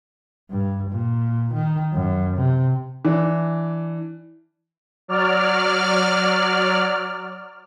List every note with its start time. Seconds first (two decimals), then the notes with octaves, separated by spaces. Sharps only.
0.51 G2
0.91 A#2
1.54 D#3
1.93 F#2
2.37 C3
3.05 E3 D4
5.08 F#3 D5 F6